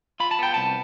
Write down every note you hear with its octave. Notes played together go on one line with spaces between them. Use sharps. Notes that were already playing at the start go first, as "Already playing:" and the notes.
F4 B5
A5
B3 G5
C2 A5